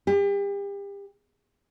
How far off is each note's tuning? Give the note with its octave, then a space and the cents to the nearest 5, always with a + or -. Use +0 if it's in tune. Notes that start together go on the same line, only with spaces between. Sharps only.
G4 +35